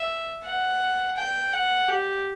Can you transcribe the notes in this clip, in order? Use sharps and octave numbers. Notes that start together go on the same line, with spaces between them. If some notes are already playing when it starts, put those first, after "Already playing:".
Already playing: E5
F#5
G5
F#5
G4